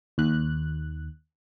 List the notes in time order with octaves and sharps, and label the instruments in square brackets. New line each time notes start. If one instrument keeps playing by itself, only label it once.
[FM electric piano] D#2 F#6